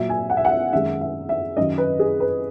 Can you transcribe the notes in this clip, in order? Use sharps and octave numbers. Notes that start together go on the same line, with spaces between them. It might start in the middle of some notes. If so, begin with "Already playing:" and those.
Already playing: A#2 F#3 E5
G#5
F#5
E5
F#5
E5
F#2 D#3 G#3 E5
E5
E5
F#2 D#3 F#3 D#5
B4
G#4
B4